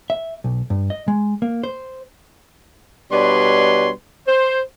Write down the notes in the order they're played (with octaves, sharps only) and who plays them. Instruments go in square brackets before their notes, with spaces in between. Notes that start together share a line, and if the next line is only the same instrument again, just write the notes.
[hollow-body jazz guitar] E5
B1
G2
D#5
G#3
A#3
C5
[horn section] B2 G3 D4 B4 C#5 C6
C5